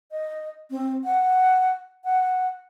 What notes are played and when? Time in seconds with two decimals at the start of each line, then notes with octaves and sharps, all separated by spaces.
0.11 D#5
0.71 C4
1.04 F#5
2.04 F#5